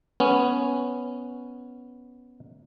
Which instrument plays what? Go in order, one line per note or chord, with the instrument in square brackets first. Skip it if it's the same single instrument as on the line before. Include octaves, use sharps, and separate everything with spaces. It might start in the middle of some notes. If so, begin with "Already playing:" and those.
[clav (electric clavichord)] B3 C#4